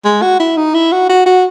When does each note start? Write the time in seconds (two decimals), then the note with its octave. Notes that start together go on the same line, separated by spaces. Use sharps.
0.05 G#3
0.22 F#4
0.40 E4
0.57 D#4
0.75 E4
0.92 F#4
1.09 F#4
1.26 F#4